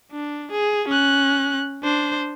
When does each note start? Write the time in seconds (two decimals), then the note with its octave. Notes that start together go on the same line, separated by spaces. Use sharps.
0.12 D4
0.52 G#4
0.88 C#4 F#6
1.83 D4 C5